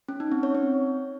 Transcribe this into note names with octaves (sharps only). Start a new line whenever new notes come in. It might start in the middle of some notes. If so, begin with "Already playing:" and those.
C#4
D#4
C4
C#5
C4